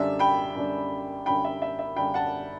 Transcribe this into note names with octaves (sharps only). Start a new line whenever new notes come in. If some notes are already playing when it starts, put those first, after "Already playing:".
Already playing: F#2 D3 G3 D4 E5
G5 B5
F#2 D3 G3 D4
F#2 D3 G3 D4 G5 B5
E5
E5
E5
F#2 D3 G3 D4 G5 B5
F#5 A5